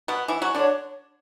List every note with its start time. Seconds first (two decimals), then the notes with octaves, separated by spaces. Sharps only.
0.08 B2 B3
0.28 E3 E4
0.42 F#3 F#4
0.55 D3 D4 C#5